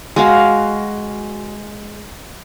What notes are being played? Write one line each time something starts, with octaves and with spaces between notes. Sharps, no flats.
G#3 F#4 F5